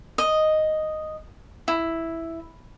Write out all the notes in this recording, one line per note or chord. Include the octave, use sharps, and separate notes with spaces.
D#5
E4